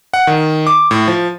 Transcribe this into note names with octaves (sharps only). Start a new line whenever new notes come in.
F#5
D#3
D6
A2
F3